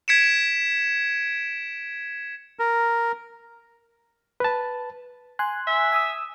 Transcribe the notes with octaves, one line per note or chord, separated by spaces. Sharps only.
G#6 B6 C#7 D7 E7
A#4
B4 A5
G#5 C6 F#6
E5
G#5 D#6 E6